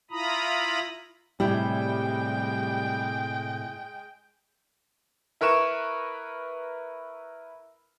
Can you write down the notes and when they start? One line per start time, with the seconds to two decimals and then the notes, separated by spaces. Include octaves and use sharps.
0.11 E4 F4 A#5 B5 D#6
1.40 A2 C3 G3 G#3 E4 G5
5.41 E4 A#4 B4 C#6 E7